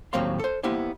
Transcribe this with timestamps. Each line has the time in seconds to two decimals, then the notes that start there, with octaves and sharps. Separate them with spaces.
0.13 D#2 A2 F#3 C4 F5 C6
0.39 A4 C5
0.63 A#3 B3 E4 G4 C5